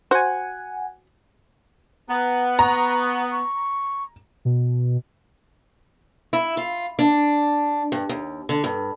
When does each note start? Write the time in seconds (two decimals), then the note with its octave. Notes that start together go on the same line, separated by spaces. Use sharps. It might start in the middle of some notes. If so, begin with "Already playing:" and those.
0.11 F#4 C5 F#5 G#5
2.09 B3 A#5
2.59 A#5 C#6
3.32 C#6
4.45 B2
6.33 E4
6.57 F4
6.99 D4
7.92 G2
8.09 D#2
8.49 D3
8.64 G2